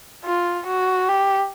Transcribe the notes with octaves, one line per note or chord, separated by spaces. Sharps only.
F4
F#4
G4